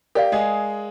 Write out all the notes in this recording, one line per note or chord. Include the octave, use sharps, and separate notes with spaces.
G4 A#4 D5 F5
G#3 G#4